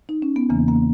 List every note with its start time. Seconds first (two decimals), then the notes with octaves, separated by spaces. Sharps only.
0.09 D#4
0.22 C#4
0.36 B3
0.49 E2 C#3 E3 A#3
0.68 A#3